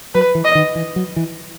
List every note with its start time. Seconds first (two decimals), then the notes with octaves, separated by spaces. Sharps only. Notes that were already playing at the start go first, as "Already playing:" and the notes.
0.14 F#3 B4
0.35 E3
0.45 D#5
0.55 D#3
0.75 E3
0.96 F#3
1.16 E3